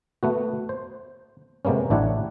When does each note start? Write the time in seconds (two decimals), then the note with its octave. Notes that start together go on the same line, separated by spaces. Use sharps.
0.23 A3 B3 F#4
0.69 C5
1.65 C3 G#3 A#3 B3 C#4
1.90 A1 D4 E4 G4 C#5 F#5